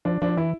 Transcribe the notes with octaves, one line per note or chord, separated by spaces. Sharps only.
F3 D4
F3 D4
E3 E4